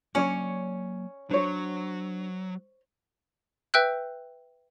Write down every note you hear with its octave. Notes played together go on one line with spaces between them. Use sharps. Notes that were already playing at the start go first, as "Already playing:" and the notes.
F#3 A#3 C#4 C#5 D5
F#3 D4 C5 C#5
B4 E5 G5 E6 F#6 G6